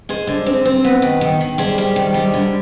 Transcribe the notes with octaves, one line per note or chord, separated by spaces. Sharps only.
G#3 G#4 C5
D3
C4
C4
B3
D#3
D#3
D#3
G3 G#4 C5
G3
D#3
G3
D3